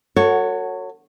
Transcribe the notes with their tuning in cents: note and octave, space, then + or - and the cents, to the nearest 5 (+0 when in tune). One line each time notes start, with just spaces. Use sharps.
F#4 +0 A4 +40 C#5 +0